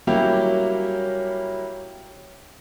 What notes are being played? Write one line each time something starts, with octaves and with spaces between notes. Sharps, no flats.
F#3 G3 A#3 C#4 E4 G4